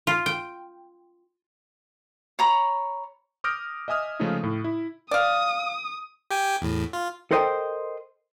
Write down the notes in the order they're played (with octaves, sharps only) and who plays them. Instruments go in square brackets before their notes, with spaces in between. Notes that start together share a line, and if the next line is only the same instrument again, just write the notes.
[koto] F4
G5
[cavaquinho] C#5 A#5 B5
[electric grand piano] D6 D#6 F6 G6 A#6 D7
D#5 E5 G#5 D#6 F6
C#3 F3 G#3 A3 C#4 D#4
A2 A4
E4
[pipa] D5 F5 [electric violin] D#6
[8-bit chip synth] G4 G5 G#5
E2 A2
F4
[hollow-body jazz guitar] A4 A#4 C5 D#5 F5 G5